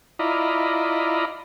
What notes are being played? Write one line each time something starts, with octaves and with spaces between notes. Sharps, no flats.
E4 F4 D5 D#5 A#5 B5